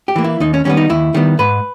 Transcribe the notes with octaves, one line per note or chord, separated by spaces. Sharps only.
G4
E3 A#3
E4
D#2 D#4
C#4
D#3 G3 B3 C#4
D#4
D#2 E4
D#3 G3 B3
G#2 B4